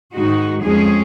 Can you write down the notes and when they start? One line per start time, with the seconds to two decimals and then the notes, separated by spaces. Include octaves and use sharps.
0.13 G#2 D#3 G#3 D#4 F#4
0.63 F2 F3 G#3 C#4 G#4